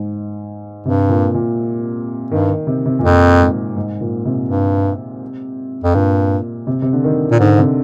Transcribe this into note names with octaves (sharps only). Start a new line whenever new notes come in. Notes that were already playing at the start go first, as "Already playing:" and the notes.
Already playing: G#2
G2 C3
A#2
A#2
G2 D#3
D#3
C3
C3
A#2
F2 C3
G#2
G#2
A#2
C3
G2
F2
G2 A#2
C3
C3
D3
D#3
A#2
G#2 D3
C3